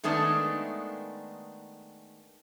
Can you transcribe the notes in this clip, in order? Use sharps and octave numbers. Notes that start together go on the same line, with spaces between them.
D#3 G#3 A3 B3 D4